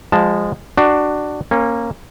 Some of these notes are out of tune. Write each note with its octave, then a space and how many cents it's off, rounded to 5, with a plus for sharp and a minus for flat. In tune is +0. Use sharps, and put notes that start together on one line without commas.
F3 +10 G#3 -15 A5 +0
D4 +15 F#4 +20
A#3 +0 C#4 -25